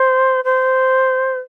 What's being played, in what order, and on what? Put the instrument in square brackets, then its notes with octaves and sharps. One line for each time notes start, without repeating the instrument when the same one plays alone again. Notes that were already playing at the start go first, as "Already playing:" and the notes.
Already playing: [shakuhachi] C5
C5